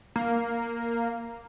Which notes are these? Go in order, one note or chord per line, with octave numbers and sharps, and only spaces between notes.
A#3